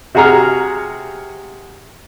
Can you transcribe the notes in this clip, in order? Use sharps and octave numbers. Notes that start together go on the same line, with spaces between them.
C3 F#4 G#4 A#5 F6